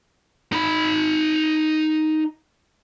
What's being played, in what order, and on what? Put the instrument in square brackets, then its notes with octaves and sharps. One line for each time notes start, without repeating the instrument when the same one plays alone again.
[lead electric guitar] D#4 B5